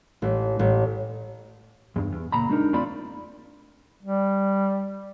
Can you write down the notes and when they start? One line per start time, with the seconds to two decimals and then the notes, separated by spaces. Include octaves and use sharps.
0.22 A1
0.59 A1
1.96 E2 G2
2.12 E2
2.32 C#2 A#2 A#5 B5
2.49 G#3 D4 D#4 A#4
2.73 E2 A3 C4 F4 D5 B5
4.03 G3